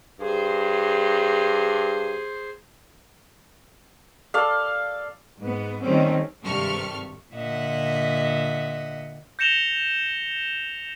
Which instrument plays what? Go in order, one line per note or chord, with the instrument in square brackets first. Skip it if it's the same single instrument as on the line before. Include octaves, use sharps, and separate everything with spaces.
[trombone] G2 [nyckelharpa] G#4 C5
[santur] A4 D5 F5
[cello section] G#2 B3
D#3 G3 A3 C4 C#4
[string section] G#1 G2 C3 A4 C#6 F6
[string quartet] A#2 D3 D#5 E5 F#5
[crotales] G6 A#6 C#7 E7 F7 G7